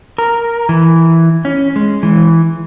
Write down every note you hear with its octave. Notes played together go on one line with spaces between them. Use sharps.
A#4
E3
C#4
G#3
E3